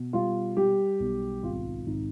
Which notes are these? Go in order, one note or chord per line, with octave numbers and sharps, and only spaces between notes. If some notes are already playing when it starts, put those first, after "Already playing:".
Already playing: B2
G3 F4
G3 G4
B1
G#1 F4
G#1 D#4